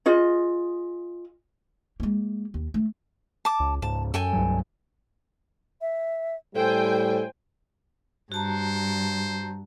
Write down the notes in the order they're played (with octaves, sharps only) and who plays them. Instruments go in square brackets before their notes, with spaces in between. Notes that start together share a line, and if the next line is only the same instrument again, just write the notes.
[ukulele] F4 G#4 D#5
[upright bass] G#3 A#3
D#2
A3
[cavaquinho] A5 D6
[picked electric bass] C#2
[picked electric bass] C#2 G#2 [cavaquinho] A5
[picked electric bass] F#2 [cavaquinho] A4 G5 G#5
[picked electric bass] C2 G2 F#3
[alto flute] E5
[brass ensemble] A2 G3 [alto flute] A4 [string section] C5 G5 G#5
[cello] G2 [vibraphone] F#4 A5 A#5 [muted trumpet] C5